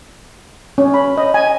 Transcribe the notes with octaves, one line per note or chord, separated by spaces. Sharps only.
C#4
B5
D#5
G#5